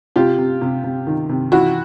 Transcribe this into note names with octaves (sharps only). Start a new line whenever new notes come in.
C3 F4 G4
C3
C3
C3
D#3
C3
E3 E4 F#4